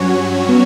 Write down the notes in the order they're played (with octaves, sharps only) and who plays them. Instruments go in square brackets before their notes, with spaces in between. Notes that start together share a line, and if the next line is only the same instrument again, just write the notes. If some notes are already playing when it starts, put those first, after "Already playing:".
Already playing: [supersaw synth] G2 F#3 C#4 F#4 C#5
[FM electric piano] B3